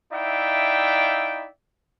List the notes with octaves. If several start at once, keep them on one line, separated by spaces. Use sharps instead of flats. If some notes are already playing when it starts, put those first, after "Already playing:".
D#4 E4 D5 E5 F5 G5